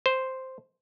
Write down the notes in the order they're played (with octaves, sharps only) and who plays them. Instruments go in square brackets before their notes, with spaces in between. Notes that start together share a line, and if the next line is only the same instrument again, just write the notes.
[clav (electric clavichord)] C5